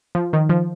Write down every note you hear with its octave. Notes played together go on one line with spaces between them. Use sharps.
F3
D#3
F3